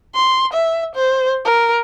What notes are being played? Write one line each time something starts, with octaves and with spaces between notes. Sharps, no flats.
C6
E5
C5
A#4